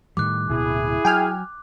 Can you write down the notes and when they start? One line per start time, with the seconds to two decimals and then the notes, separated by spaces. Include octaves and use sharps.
0.17 A2 D#3 G3 D6 F#6
0.49 D1 B2 E4 G#4
1.05 F#3 G5 G#5 F6